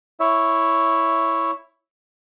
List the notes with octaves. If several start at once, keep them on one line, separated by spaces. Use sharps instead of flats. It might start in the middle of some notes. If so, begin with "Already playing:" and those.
E4 C#5 E5